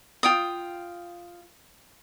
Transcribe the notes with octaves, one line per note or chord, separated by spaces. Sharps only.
F4 G5 D#6